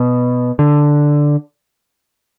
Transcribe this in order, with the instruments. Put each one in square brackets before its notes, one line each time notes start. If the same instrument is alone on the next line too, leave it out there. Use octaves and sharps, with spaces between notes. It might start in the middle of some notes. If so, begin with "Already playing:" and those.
Already playing: [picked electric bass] B2
D3